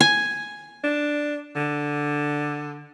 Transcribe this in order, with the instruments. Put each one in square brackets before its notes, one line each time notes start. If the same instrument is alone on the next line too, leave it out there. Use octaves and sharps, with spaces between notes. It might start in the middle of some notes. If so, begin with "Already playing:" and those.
[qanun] G#5
[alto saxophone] D4
D3